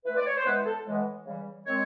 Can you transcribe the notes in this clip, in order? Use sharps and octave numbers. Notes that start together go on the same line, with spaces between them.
E3 A3 C4 B4
D5
C#5
C5
E3 G#3 B3 B4
A4
A2 E3 G#3 B3
C#3 E3 G3
D#3 G#3 C4 C#5